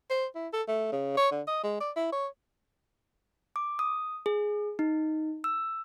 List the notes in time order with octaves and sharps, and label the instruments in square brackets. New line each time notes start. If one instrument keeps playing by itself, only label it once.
[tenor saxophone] C5
E4
A4
A3
C#3
C#5
D3
D#5
G#3
D5
E4
C#5
[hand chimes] D6
D#6
G#4
D#4
E6